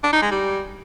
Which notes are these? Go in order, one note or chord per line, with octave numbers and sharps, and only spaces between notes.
D4
D#4
G#3
G3